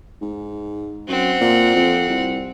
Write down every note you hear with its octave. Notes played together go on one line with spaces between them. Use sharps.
G#2
F#2 C4 F#5
A#2
F2
C2